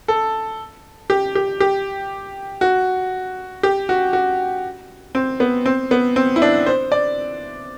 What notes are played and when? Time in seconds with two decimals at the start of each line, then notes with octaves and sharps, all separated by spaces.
0.08 A4
1.10 G4
1.35 G4
1.60 G4
2.61 F#4
3.63 G4
3.89 F#4
4.13 F#4
5.15 C4
5.40 B3
5.66 C4
5.91 B3
6.16 C4
6.36 E4
6.42 D4
6.66 C5
6.92 D5